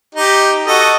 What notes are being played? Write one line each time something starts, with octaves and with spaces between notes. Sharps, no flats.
D#4 G4
F#4 A4 D#5